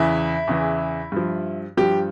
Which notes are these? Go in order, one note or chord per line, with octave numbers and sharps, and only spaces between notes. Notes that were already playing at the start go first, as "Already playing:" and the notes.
Already playing: E2 C#3 E3 E4
E2 C#3 E3
G2 F3
G2 F3 G4